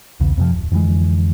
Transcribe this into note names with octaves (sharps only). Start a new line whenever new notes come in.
B1 E2 C#3
F2 C3 F3
D1
F2 D3 E3 G#3